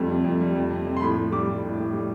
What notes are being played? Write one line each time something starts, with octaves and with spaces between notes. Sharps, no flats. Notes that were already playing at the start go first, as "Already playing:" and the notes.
Already playing: F2 G3 A3
C3
F2
G3
F2
C3
F2
C6
A2 B5
A2
G3 D6
G3
A2
A2
G3